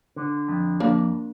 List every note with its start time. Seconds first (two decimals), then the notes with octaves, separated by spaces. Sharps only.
0.16 D3
0.48 F2
0.80 F2 A#3 D4